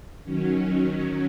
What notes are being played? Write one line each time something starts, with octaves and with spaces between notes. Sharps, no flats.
D#3 F#3 C#4